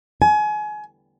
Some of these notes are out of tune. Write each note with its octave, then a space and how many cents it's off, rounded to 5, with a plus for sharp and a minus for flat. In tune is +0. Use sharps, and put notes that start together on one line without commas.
G#5 +30